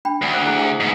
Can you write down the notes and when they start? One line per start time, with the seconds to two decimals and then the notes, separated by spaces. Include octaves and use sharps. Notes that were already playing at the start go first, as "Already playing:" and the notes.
0.05 D4 G5 B5
0.22 D2
0.34 C5
0.46 E4 G#4 C5
0.59 E4 G#4 G#5
0.80 G#2 B3